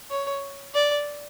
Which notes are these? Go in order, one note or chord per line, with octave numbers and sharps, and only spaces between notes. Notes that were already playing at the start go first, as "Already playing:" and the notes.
C#5
D5